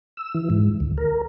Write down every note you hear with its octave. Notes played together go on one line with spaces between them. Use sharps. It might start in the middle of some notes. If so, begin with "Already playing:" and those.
E6
E3
G#2
D2
A#4